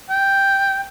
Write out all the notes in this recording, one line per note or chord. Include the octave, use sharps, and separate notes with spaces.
G5